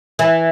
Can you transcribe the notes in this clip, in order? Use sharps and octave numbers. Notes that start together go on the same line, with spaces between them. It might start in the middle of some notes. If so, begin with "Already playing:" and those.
E3